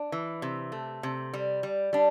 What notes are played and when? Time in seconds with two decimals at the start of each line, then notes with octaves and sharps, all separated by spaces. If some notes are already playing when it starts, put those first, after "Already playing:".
Already playing: D4
0.12 E3
0.42 C3
0.72 A3
1.03 C3
1.34 G3
1.63 G3
1.93 G3 D4